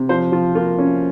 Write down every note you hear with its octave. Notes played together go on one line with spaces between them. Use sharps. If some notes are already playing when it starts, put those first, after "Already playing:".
Already playing: C3
F3 C5
F3 F4
A#3 F4
C#4